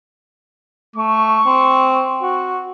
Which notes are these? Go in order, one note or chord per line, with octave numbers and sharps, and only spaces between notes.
A3 C#6
C4
F#4